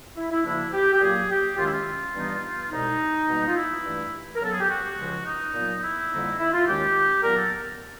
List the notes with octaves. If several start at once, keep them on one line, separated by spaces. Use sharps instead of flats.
E4
E4
D2 C#3 F3 A#3 D4 E4
G4
G4
A#2 F#3 A#3 G#4
G4
F#2 D#3 G#3 C#4 F4
E4
F4
G2 E3 G3 B3 D#4
C2 B2 G#3 D#4
B2 G3 A#3
F4
E4
G2 E3 A3
A#4
C#3 F#3 B3 A4
G#4
G4
F#4
C#2 C#3 F3 G#3
D#4
A#2 F#3 B3
E4
F2 D3 G3 A#3 D#4
E4
F4
D#2 D#3 G#3 C#4 G4
A#2 F#3 B3 A#4
A4